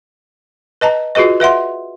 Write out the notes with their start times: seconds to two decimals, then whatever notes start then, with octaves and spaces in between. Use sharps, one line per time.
0.81 B4 D#5 A5 A#5
1.15 F4 F#4 G#4 B4 D#5
1.40 B4 E5 F#5 C6